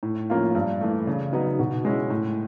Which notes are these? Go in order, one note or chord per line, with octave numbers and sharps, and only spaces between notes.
A2
F3 A#3 C#4 F4
G2
E3 A3
C#3
F#3 B3 D#4
B2
G#3 C#4 E4
A2